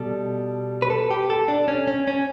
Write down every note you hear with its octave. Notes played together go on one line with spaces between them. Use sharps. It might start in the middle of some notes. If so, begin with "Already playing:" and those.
Already playing: B2 G3 A4
B4
A4
G4
A4
D4
C#4
C#4
C#4